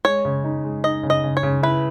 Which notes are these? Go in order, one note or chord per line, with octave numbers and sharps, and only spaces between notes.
G#3 C#5
C#3
D#4
G#3
D#4 D#5
C#3
D#5
C#3
C#5
C#3
E4 B4